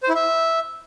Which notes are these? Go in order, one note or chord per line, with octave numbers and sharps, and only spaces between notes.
C5
E4
E5